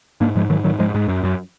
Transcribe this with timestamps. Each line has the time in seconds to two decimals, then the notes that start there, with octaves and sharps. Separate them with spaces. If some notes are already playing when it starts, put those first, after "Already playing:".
0.21 G#2 A#3 D4
0.36 G#2 F3 G#3
0.50 G#2 D#3 F#3
0.64 G#2 D#3 F#3
0.79 G#2 F3 G#3
0.95 G#2
1.08 F#2
1.23 F#2